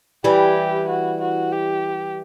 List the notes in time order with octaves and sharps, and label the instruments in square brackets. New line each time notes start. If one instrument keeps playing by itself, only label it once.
[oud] E3 G3 [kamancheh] G4
[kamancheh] F#4
F#4
G4